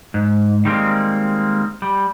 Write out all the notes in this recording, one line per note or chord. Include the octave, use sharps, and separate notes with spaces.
G#2
D#3 G3 G#3 A#3 C4
G3